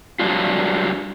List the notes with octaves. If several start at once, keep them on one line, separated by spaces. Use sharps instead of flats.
F#3 G3 D4 F4